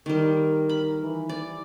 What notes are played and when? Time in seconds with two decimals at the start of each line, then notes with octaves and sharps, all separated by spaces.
0.06 D#3 G3 A#4
0.69 B5
1.01 E3
1.29 D5